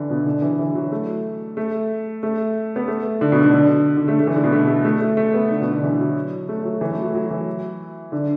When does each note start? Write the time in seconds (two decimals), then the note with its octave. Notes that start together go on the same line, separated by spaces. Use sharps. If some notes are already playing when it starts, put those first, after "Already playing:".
Already playing: D3 E3
0.10 B2
0.26 D3
0.42 E3
0.59 E3
0.75 F#3
0.92 A3
1.57 A3
2.23 A3
2.76 B3
2.88 A3
3.21 D3
3.32 B2
3.43 D3
3.54 D3
3.97 D3
4.08 A3
4.19 A3
4.27 E3
4.36 D3
4.44 B2
4.52 A3
4.68 A3
4.85 A3
5.01 A3
5.17 A3
5.34 B3
5.51 D3
5.61 B2
5.72 D3
5.83 E3
6.00 F#3
6.49 A3
6.65 F#3
6.81 E3
6.92 A3
7.03 F#3
7.14 F#3
7.30 E3
8.12 D3